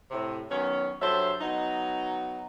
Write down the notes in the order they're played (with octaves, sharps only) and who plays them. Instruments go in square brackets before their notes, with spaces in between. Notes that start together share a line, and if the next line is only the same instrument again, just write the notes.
[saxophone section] A2 C3
D#3 F#3 B3 C#4
G2 F#3 A4 C5 E5
F#3 B3 D#4